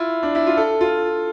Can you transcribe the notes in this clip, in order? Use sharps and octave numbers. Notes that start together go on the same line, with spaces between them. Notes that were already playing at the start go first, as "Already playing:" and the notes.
Already playing: E4 F4
D4
E4
F4
A4
F4